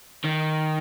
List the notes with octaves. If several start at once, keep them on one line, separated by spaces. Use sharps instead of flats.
D#3